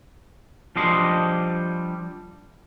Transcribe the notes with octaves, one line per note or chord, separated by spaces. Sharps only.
F3 G3 D4 D#5 C6